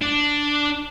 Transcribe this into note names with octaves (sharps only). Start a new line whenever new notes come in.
D4